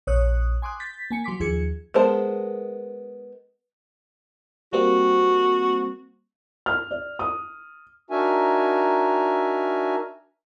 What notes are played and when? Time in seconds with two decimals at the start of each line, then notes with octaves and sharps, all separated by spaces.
0.07 A#1 C#5 D#6 F#6
0.62 G#5 C6 D6 D#6 F#6
0.80 G6 A6 B6
1.11 A#3 G#5 C#7
1.24 F#3 C6 D6 B6
1.40 D#2 F3 G#4 G#6 C#7
1.94 G#3 B3 A#4 C5 A5
4.73 G3 A#3 C4 F#4
6.66 F6
6.91 D5
7.19 D#6
8.10 D4 D#4 F#4 A#4 E5 G#5